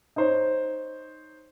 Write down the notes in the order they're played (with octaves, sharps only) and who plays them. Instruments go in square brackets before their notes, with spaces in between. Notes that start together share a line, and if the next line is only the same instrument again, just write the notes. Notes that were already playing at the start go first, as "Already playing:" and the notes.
[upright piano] D#4 C5 C#5